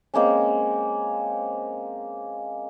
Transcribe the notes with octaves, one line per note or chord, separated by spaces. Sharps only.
G#3 A#3 C4 C#4